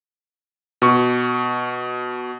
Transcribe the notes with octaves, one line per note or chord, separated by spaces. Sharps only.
B2 C#6